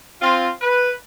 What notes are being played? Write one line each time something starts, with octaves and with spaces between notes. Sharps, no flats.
C4 F4
B4